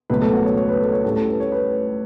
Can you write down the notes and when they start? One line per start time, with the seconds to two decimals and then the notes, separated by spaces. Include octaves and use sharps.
0.10 C#2 B2 F#3 A3 B4
0.22 A4
0.33 F#4
0.45 C#5
0.57 C#5
0.69 B4
0.81 A4
0.93 C#5
1.04 A2 G3 C#4 A4
1.16 A4
1.28 B4
1.40 C#5
1.52 B4